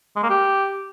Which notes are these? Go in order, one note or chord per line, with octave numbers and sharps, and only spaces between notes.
G#3
A#3
G4